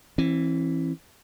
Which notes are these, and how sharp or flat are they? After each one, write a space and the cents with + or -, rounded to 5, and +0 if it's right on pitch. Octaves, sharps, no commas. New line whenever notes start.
E3 +0 C4 +45